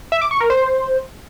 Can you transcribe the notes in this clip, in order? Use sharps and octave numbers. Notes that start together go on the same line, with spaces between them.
E5
D6
C#6
A#4
C5